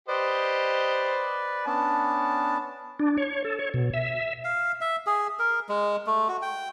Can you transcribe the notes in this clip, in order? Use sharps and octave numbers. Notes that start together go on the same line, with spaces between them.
G4 B4 C5 D5 D#5
B3 C#4 D4 A5
D4
C#5
A4
C#5
B2
E5
F5
E5
G#4
A#4
G#3
A3
F#4
G5